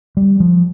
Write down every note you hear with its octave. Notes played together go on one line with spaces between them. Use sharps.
G3
F3